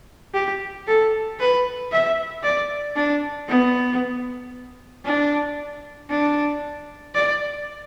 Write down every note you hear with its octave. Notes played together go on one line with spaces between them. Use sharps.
G4
A4
B4
E5
D5
D4
B3
D4
D4
D5